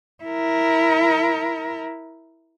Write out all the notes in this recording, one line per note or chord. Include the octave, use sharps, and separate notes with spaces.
E4 A#4